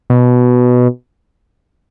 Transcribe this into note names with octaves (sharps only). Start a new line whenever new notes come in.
B2